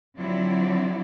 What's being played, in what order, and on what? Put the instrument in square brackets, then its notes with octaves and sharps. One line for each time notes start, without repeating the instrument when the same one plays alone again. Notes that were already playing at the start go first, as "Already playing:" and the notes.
[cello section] D3 F3 F#3 C4 E4 D5